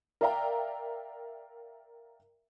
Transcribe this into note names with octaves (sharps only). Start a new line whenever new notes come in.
A#4 D5 E5 F5 G5 A#5